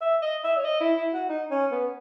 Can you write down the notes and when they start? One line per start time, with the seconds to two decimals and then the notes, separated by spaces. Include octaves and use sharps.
0.01 E5
0.22 D#5
0.44 E5
0.57 C#5
0.64 D#5
0.80 E4
0.97 E4
1.13 F#4
1.29 D#4
1.51 C#4
1.72 B3